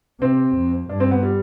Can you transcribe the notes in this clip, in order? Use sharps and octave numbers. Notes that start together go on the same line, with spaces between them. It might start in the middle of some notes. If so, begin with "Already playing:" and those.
C3 C4
F2
G2 D4
C4
B3
G3